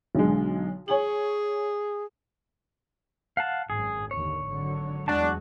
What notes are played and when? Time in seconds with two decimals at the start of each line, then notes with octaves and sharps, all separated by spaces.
0.15 B1 D3 G#3
0.88 G#4 C#5 G#5 F#7
3.37 F5 F#5 A5
3.70 G#1 F#2 G#4
4.11 D#2 D3 C#5
4.46 G#1 D3 F#3
5.08 E2 F#3 G#3 D4 F#4 A5